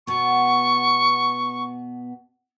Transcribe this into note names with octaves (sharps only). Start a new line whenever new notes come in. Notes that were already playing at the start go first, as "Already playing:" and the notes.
B2 B3 C#6